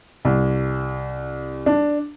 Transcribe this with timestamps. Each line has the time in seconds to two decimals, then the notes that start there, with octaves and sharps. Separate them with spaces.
0.25 C2
1.66 D4